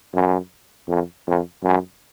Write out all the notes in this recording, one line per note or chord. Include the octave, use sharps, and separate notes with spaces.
F#2
F2
F2
F#2